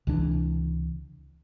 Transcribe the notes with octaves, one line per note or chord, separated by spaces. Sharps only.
C#2 C3 E3 D4